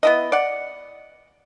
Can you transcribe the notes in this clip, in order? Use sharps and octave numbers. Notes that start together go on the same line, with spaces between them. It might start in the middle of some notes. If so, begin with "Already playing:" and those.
B3 E4 D#5
D5 F#5